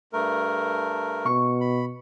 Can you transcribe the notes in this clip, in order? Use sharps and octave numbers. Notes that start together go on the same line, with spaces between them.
G2 A3 A#4
B2 C#6
B5